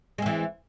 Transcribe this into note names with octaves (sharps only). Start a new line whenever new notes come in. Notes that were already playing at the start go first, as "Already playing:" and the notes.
E3 G#3 C4